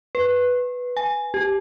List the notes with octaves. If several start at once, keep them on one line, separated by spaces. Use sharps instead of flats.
B4
G#5
G4